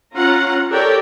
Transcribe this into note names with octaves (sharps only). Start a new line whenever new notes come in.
C#4 F4 F#5 A#5
G4 A4 A#4 C#5 D5 G5